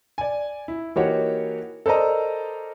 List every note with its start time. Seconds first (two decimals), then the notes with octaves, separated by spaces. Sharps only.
0.18 D5 G#5
0.68 E4
0.96 E3 A#3 D#4 F#4 G4 C#5
1.86 A4 A#4 C5 D5 D#5 A#5